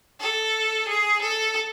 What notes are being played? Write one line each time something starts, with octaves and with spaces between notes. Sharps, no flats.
A4
G#4
A4